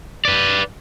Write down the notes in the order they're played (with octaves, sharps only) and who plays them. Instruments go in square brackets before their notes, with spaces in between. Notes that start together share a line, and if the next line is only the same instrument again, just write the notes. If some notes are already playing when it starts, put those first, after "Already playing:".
[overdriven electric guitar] B4 D5